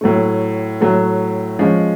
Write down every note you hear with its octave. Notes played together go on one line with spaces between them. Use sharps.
A2 F#3 A3
A2 F#3 A3
F3 G#3 C#4